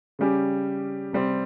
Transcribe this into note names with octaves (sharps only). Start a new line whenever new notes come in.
C#3 G3 C#4 G4
C3 G3 C4